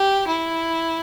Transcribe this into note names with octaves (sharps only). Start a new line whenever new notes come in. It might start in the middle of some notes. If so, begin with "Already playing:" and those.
Already playing: G4
E4